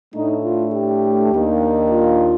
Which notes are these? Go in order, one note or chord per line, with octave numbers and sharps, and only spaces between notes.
A2 A3 D4 D#4
F4
G4
D#2 D#3 A#3 D4
F4